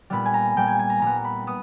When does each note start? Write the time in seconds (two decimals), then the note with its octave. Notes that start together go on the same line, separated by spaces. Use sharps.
0.10 A#2 G3 B3 B5
0.25 G#5
0.34 A#5
0.57 A#2 G3 B3 G5
0.67 G#5
0.79 G#5
0.90 A#5
1.01 A#2 G3 B3 A#5
1.25 B5
1.47 B3 D#6